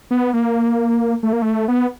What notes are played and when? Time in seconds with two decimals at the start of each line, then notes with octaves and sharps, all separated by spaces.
0.11 B3
0.33 A#3
1.23 A3
1.33 A#3
1.42 A3
1.68 B3